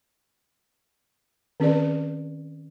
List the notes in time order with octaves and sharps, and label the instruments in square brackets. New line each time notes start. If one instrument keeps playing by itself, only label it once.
[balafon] D#3 C4 C#4 G#4 B4 D5